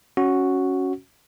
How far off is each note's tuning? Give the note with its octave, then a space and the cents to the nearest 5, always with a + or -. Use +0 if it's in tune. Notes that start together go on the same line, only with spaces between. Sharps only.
C#4 +0 F#4 +0